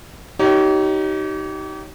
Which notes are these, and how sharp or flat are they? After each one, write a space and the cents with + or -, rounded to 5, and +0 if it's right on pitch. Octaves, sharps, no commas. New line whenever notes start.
D#4 +10 G4 -35 C#5 +15